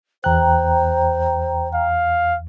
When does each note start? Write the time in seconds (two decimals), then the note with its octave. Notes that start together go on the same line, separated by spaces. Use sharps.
0.24 E2 C5 G5 A#5 F#6
1.74 F5